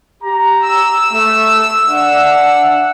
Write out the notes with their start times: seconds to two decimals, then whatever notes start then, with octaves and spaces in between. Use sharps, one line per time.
0.23 G4 A#5
0.65 E6
1.12 A3
1.88 D4 E5 F#5